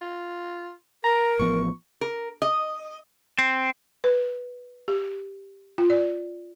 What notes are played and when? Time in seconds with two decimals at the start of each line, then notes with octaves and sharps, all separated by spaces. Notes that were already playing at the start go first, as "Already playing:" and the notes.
0.01 F4
1.04 A#4 A#5
1.39 A1 F3 B3 C#6
2.01 A#4
2.42 D#5
3.39 C4
4.04 B4
4.88 G4
5.78 F4
5.90 D5